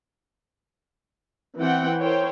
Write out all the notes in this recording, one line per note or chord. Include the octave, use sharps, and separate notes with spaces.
E3 C4 F#5 G5
E4 A#4 C5 C#5 G5